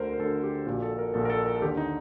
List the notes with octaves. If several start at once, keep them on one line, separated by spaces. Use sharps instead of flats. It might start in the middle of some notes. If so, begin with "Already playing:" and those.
Already playing: D2 D3 A#4 C5
A#4
D2 D3 A4
G4
A#1 A#2 F#4
A4
A#4
A#1 A#2 A4
A#4
A4
A#4
A4
D#2 D3 G4
D#4